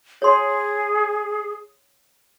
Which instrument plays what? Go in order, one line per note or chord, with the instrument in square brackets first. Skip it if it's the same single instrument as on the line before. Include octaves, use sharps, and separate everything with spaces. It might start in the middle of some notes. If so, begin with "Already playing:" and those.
[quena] G#4 [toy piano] C#5 C6